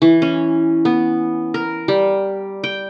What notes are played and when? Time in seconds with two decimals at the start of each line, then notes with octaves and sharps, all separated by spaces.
0.02 E3
0.22 C#4
0.85 B3
1.54 A#4
1.88 G3
2.64 G5